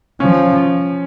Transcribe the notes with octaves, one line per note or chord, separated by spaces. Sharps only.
F3 C#4